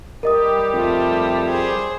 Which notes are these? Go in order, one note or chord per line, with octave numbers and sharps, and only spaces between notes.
G3 G4 A#4 D#5 D#6
F2 A3 F4
G#4 C5